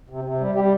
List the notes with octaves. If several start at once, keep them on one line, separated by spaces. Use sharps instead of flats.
C3
C3
G3
G3 G4